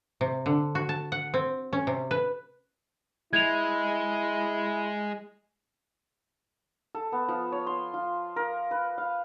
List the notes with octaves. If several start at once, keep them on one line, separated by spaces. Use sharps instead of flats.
C3
D3
F#4
A5
F#5
C4
C#4
C3
B4
G#3 E4 G#6 F7
A4
B3
F3
C#5
C6
F4
A#4
B4
F5